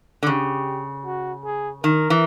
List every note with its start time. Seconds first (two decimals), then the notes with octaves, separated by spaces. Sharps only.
0.23 D3
0.26 C#3 G4
1.05 F#4
1.44 G#4
1.84 D#3 A#4
2.10 E3